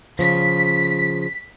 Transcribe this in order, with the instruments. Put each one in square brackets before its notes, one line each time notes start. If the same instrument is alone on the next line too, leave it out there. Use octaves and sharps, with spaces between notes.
[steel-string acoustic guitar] C#3 F3 [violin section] B6